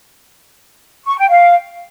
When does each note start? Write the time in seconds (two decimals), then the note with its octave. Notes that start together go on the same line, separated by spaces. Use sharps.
1.06 C#6
1.17 G5
1.29 F5